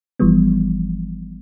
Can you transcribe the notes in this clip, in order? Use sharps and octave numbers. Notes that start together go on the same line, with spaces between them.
G1 E3 F3 G3 B3